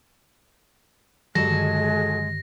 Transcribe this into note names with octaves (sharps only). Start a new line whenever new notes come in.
G2 D3 D#3 F#3 G#3 G#4 A4 A#6